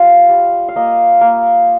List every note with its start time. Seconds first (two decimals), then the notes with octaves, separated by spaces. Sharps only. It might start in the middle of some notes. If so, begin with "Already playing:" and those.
Already playing: G3 F4 F5
0.29 G3
0.68 F5
0.76 A#3 D#5
1.21 A#3